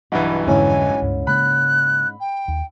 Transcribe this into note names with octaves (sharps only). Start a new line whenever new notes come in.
B1 G2 E3 F#4
F2 G#2 D3 C#4 E4 G#5
C#2 G2
C#3 G#3 A#3 B5 F#6
G5
D#2